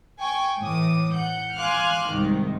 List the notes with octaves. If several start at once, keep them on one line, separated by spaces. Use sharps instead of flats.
G5 G#5 C#6
A2 E3 D6 D#6
F#5 G6
F5 G#5 C6 D6 F6 F#6
C2 G#2 D#3